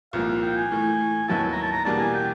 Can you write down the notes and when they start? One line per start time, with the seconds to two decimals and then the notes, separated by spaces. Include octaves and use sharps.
0.13 C2 A#2 F3 A#3 F5
0.28 F5
0.42 G5
0.56 G#5
0.71 A2 E3 A3
1.28 D#2 D#3 F#3 B3 E4 A5
1.52 A#5
1.62 A5
1.72 A#5
1.85 E2 B2 G3 A#3 D4 A5
1.99 G#5
2.15 G5